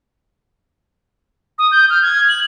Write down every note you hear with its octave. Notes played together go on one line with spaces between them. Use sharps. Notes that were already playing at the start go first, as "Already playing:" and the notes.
D#6
G6
F6
G#6
F#7